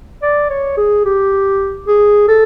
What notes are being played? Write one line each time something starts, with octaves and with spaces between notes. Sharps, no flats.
D5
C#5
G#4
G4
G#4
A4